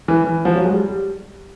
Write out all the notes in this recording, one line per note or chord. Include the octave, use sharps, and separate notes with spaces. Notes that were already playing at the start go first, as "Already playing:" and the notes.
E3
E3
F3
F#3
G#3
G3
G3